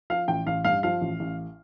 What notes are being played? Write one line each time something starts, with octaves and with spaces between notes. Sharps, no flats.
F3 F5
A1 G5
A1 F5
G2 F5
F3 F5
A1
A1